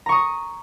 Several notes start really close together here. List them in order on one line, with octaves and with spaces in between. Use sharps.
A#5 C#6 D#6